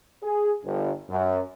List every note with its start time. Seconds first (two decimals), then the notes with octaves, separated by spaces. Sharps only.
0.23 G#4
0.64 G1
1.10 F#2